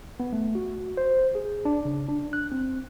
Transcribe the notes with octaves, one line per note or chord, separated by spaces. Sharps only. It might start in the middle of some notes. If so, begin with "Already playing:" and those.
B3
A3
F#4
C5
G#4
D4
C#3
D4
F#6
C4